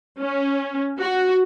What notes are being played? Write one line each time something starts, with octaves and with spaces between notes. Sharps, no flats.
C#4
F#4